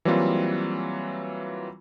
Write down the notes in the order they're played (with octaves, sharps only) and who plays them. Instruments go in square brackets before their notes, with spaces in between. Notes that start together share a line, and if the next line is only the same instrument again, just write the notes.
[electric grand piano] E3 F#3 G3 A#3 C4 F4